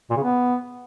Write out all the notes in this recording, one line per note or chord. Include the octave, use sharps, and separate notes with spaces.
A#2
C#3
B3